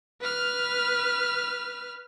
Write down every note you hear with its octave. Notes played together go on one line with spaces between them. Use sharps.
B4 F6